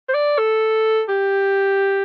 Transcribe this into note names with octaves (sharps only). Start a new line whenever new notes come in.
C5
D5
A4
G4